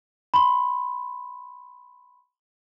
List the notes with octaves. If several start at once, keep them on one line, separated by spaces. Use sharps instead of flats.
B5 C6